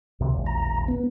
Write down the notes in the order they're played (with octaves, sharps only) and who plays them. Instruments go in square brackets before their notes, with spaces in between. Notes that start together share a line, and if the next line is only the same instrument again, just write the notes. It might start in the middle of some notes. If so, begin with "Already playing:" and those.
[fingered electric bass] D2 C3 D#3
E1 A#1 D#2
[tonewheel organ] A#5
B3